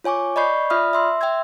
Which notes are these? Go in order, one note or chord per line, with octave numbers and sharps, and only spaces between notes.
F4 C#5 G#5 C#6 D6
D5 D#5 B5 C#6 G6 C7
F4 D5 E5 B5 D#6 F6
E5 C6 E6
E5 G5 C6 E6 G#6